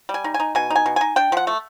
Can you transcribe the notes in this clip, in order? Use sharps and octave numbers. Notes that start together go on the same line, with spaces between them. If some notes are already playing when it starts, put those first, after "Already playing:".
G3
G#5
D#4
G#5
D#4
B2 G#5
D#4
G#5
B2
D#4 G#5
D4 G5
F3 F#5
A3